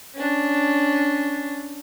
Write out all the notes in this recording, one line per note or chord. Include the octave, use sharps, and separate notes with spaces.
C#4 D4